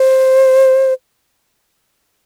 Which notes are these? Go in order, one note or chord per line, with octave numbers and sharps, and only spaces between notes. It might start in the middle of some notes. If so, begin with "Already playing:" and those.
Already playing: C5